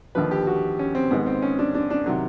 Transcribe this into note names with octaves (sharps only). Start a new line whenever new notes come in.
D#2 D3 F3 B4
G4
F#4
C#4
C4
G#2 D#3 G#3 B3
C4
C#4
D4
D4
D4
C3 D#3 F#3